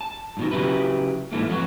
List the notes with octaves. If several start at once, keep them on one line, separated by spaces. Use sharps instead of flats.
A5
G2 B2 D#3
C#3 F#3 E4 G4 B4
G#2 E3 A3 A#3
F2 F#3 B3 F#4